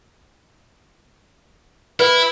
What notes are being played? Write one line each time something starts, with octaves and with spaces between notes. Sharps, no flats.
E4 B4